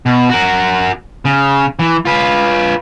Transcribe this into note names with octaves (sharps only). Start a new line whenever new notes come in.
B2
F#4 A#4
C#3
E3
F4 B4